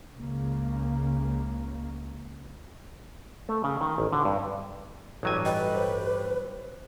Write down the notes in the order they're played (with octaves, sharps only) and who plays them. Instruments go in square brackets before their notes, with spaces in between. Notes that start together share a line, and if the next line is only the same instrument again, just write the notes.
[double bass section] C#2 C#3 A#3
[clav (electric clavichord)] A3
C#3
D#3
A1
D3
G2
[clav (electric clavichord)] A1 F#3 G#5 [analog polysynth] G2 G3
[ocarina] B4 [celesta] D#5 G5
[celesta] C5 C#5